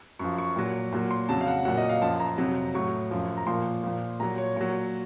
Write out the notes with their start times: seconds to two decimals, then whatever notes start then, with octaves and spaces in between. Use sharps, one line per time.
0.19 F#2 F3 C#6
0.38 C#6
0.56 A#2 F#3
0.93 A#2 F#3
1.11 C6
1.29 F2 C#3 F#3 A5
1.41 F5
1.48 F#5
1.65 A#2 F#3 F#5
1.77 D#5
1.89 F5
2.02 F#2 F3 A5
2.20 A#5
2.38 F2 C3 F#3
2.75 A2 F#3 C#6
3.11 F#2 F3
3.37 A#5
3.47 A#2 F3 C6
3.84 A#2 F3
4.20 A#2 F#3 A#5
4.38 C#5
4.56 A#2 F#3 C#5